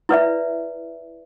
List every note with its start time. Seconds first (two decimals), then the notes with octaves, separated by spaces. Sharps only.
0.09 E4 B4 D5 E5